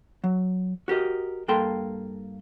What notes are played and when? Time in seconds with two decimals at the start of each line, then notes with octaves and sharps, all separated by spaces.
0.24 F#3
0.88 F#4 G4 A#4 D#5
1.48 G2 A#3 A4 G5 C6